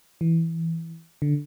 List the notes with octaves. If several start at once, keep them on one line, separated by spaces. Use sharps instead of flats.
E3
D3